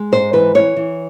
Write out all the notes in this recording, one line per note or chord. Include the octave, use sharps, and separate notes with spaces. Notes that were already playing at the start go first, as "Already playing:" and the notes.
Already playing: G#3
G#2 C5
E3 B4
E3 C#5
E3